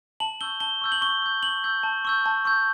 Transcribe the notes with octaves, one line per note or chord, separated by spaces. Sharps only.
A5 F#7
C#6 E6 G6 G7
A5 G7
C#6 E6 G6
F#7
C#6 G7
E6 G6
C#6 F#7
E6 G6
A5
C#6 E6 G6
A5
C#6 E6 G6